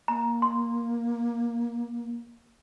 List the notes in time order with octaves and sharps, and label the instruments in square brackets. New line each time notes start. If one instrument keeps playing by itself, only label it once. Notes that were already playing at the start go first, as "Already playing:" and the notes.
[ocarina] A#3 [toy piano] A#5
[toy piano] C6